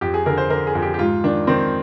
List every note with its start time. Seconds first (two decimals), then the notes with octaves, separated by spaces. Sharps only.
0.01 F2 G4
0.14 G#4
0.26 D3 A#4
0.38 C5
0.50 D3 A#4
0.67 G#4
0.75 F2
0.82 G4
0.94 G4
0.99 G#2 F4
1.24 D#3 D4
1.47 D#3 C4